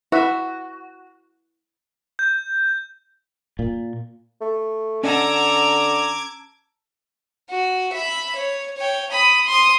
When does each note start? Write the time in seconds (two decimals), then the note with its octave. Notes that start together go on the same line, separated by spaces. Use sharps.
0.12 E4 F#4 B4 E5
2.19 G6
3.59 A#2
4.41 A3
5.03 D3 C#4 A4 D#5 F#5 A#5 D6 G#6
7.50 F#4
7.93 E5 B5
8.36 C#5
8.77 C#5 G5
9.11 B5 D#6
9.47 C6 D#6